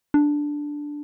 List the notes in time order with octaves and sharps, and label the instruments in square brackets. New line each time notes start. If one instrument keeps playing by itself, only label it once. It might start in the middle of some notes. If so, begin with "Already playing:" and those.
[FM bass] D4